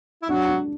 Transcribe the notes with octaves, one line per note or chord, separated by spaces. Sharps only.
E4
F#3 D4 F#4
D4